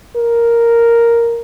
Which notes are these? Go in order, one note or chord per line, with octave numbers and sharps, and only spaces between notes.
A#4